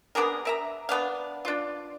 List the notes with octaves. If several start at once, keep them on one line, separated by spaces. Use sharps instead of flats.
B3 D4 G#4 A#4
A#4 E5 A#5
B3 D4 F5
D4 F4